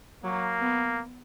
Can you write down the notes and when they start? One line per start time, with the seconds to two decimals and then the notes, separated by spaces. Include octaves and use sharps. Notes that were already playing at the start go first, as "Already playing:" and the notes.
0.24 F#3 A#3
0.61 B3